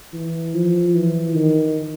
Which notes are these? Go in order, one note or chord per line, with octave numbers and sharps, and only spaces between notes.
E3
F3
E3
D#3